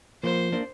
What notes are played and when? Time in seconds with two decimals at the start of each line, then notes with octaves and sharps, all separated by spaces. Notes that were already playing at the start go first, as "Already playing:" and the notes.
0.23 F3 A#3 C5
0.52 A#3 D4